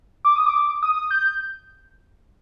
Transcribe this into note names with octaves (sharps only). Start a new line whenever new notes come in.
D6
D#6
D6
D#6
G6